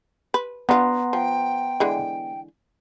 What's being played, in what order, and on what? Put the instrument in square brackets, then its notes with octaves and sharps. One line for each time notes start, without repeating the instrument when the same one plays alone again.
[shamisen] B4
[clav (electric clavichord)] B3 [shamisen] D4 F4 [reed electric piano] F#5 A#5 C6
[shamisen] F3 [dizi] G5
[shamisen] D3 E3 G#3